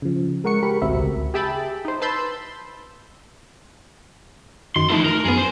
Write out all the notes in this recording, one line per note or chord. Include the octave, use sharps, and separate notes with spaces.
C#3 F3
G#3 A#4 F#5 C#6 C#7
G4 A4 A#4 B5
A1 D2 C4 F#4 E5 B5
C#2
G4 G#4 E5 G5 A5 B5
D#4 C5
B4 A5 B5 C6 E6 G6
F#2 D#3 C6
E3 F3 A3 D#4 E4
A#4
F#2 B3 G#4
C5